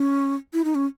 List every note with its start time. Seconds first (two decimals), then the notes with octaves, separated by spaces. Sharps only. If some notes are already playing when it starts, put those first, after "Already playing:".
Already playing: C#4
0.53 E4
0.64 D#4
0.75 C#4